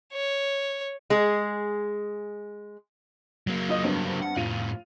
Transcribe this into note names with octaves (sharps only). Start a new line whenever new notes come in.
C#5
G#3 G#4
F#3 A#3
F4 D#5
G2 B3 C4
F#5
F2 A2 F4 D#7 F7